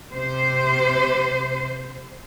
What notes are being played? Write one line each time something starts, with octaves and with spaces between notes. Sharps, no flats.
C3 C5